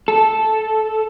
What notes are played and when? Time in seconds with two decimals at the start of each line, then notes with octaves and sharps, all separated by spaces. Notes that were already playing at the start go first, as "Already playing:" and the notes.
0.08 A4